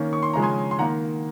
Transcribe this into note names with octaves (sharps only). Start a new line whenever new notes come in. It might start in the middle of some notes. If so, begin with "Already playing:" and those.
Already playing: D#3 A#3 C#4
C#6
C6
C#3 F3 G#3 C#4 A#5
G#5 C6
C6
D#3 A#3 F#5 A#5